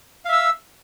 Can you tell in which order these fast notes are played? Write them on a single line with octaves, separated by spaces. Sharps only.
F5 E5 E6